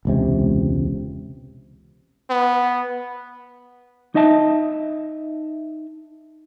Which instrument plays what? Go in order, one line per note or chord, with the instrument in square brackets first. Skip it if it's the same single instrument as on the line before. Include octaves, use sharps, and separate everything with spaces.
[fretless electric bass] E1 C#2 C3
[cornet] B3
[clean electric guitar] D#4 D#5 E5 A5